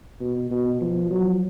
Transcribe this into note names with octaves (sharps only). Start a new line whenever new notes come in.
B2
B2
F3
F#3